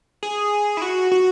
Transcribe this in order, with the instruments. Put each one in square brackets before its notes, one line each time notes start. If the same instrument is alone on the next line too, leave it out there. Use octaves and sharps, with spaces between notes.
[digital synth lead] G#4
E4
F#4
F#4